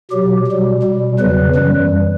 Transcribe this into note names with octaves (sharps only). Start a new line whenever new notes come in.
B2 F#3 G4
B2 G3
B2 G3
E2 C#3 F#3 B4
F#2 E3 G3